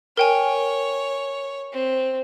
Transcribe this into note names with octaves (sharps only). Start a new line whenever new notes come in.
A#4 C#5 G5 G#5
C4